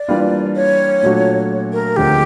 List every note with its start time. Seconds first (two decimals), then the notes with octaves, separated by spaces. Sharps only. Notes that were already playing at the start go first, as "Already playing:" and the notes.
Already playing: D5
0.08 E3 G3 A#3 D4 F4
0.56 C#5
1.03 A#2 F#3 A3 D4 F#4
1.73 A#4
1.96 D2 D3 F3 G#3 C4 G4